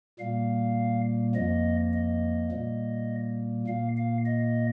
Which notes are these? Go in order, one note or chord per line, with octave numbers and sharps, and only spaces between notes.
A#2 G3 A#3 F5
F2 F3 A#3 D#5
D#5
A#2 G3 A#3
A#2 A#3 F5
F5
D#5